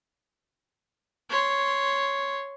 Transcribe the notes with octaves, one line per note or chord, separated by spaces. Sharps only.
C#5 C6